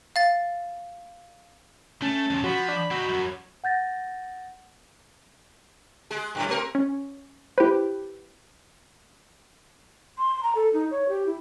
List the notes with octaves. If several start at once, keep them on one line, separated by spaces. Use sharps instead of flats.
F5 A6
A3 C#4 A5
F2 C3
F3 F#4 B5
D4
C4 D#4 F#4
F#2
F#5 G6 A6 A#6
G#3 G#4
F#2 A2 G3
A3 C4 A#4
C#4
E4 G4 B4 C5
C6
A#5
A4
D#4
C#5
G4
E4